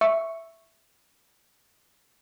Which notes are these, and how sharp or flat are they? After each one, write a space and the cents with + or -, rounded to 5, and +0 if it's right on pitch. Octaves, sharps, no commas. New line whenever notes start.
E5 +0 C#6 +0